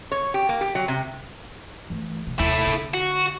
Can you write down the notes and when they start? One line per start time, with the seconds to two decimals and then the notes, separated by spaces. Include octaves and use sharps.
0.12 C#5
0.34 G4
0.49 A#3
0.61 G4
0.75 F#3
0.88 C3
1.90 E3 A3
2.27 B2
2.40 D#2 C3 A3 E4
2.67 D3
2.94 F#4